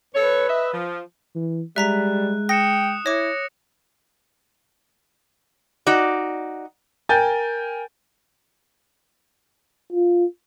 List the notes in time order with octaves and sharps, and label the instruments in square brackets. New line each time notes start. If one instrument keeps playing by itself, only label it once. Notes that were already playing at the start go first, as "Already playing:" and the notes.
[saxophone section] F2 A4 C#5 [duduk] B4
[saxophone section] D#5 E5
F3
[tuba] E3
[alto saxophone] G3 [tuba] G#3 [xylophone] E5 A#5 B6 [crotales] F#6
[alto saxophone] G5 [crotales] D#6 C#7 E7 [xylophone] A#6
[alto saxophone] E4 [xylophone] C#5 D6 [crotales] A#6
[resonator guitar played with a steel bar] D#4 F#4 D5
[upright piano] A#4 G5 G#5 G6 A6
[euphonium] F4